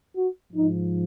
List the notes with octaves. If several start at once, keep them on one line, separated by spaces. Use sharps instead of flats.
F#4
G#2 F3 D#4